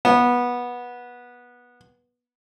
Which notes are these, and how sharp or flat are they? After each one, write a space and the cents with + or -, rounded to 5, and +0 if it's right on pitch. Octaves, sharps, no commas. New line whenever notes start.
B3 -15